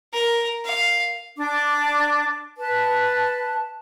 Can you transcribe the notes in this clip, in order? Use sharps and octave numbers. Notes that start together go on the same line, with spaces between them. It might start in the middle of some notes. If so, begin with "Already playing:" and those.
A#4
F5
D4 D6
B4 A5